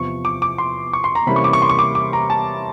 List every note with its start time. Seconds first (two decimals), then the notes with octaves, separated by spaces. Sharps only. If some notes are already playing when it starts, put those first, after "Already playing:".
Already playing: E2 C3 F3 C#6
0.25 D6
0.42 D6
0.58 C6
0.93 C#6
1.04 C6
1.15 A#5
1.27 C3 E3 G3 A#3 C#4 B5
1.36 C#6
1.44 D6
1.53 C#6
1.62 C6
1.69 C#6
1.79 D6
1.95 D6
2.13 A#5
2.30 A5